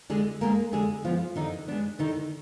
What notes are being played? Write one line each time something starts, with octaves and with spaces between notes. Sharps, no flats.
D3 G#3 G#4
G#3 A#3 B3 A#4
D3 G#3 G#4
F3 G#3 B3 F4
D3 D#3 D#4
G#3 B3 D4
D3 D#3 D#4